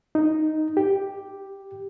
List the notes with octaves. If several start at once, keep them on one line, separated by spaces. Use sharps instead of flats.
D#4
G4